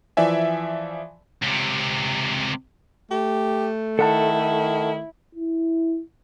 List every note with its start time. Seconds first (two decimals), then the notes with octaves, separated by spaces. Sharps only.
0.17 E3 F3 D5 E5 G#5
1.42 C#2 C3
3.11 A3 G4
3.99 D#3 E4 A4 F#5 A5
5.35 E4